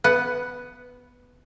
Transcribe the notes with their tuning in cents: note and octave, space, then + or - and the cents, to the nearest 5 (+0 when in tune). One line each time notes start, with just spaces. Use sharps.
B3 +0 B4 +10 F#5 +10